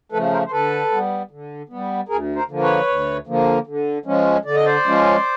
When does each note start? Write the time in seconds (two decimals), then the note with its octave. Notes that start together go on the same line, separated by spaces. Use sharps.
0.12 C#3 F3 A3 A4 B4
0.32 A#4 C5
0.46 C5
0.52 D3 A4 B4
0.91 G3 B3
1.31 D3
1.69 G3 B3
2.09 D2 G#4 A#4
2.35 A#4 C5
2.48 D3 F3 A#3
2.62 B4 C#5
2.87 D2
3.27 D3 F3 A#3
3.67 D3
4.05 F3 G#3 C#4
4.45 D3 D5
4.55 D#5
4.65 C5 D5
4.85 F3 G#3 C#4